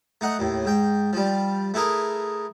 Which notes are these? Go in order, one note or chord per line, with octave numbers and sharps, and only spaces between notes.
A3 D#4 F#5
D#2 A2
G#2 G5
F3 G3
A3 E4 G#4 A#4